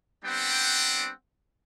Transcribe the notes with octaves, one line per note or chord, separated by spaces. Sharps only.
G3 B3 C4 D4 F#5 G5